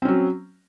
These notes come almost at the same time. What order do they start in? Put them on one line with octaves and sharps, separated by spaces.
C4 C#4 F#3